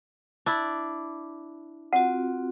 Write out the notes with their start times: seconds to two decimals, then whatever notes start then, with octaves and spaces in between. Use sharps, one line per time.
0.46 D4 E4
1.93 C4 F4 F#4 F#5